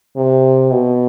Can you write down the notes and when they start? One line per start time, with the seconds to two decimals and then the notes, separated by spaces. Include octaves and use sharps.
0.16 C3
0.71 B2